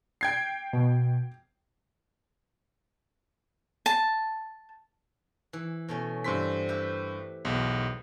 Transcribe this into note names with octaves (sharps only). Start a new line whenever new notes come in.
G5 G#6 C7
B2
A5
E3
B2 A3 C#4
G2 E3 C4 C6 B6
G4 B4 E5
B1 E2